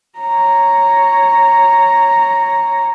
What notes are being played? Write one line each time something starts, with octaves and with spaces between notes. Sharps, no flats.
C#5 A#5